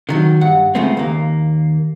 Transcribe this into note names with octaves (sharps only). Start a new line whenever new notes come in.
D3 D#3 F#3
G2 F#5
C#3 F3 G#3 A3 B3 C4
D#2 A#3